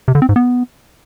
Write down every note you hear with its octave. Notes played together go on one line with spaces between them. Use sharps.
C3
D3
C4
G#2
B3